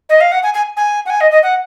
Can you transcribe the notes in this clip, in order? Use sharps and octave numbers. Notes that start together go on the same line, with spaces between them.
D#5
F5
F#5
G#5
G#5
G#5
F#5
G#5
D#5
D#5
F#5